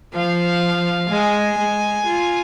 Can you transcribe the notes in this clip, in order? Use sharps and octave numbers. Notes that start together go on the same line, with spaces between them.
F3 F5
G#3 G#5
G#3
F4